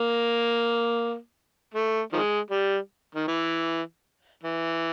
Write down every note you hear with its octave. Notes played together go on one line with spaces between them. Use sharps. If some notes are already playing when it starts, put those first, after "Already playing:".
Already playing: A#3
A3
D#3 F3 G#3
G3
D#3
E3
E3